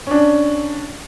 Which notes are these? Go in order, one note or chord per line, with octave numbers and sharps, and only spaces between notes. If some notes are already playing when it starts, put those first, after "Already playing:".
C#4 D4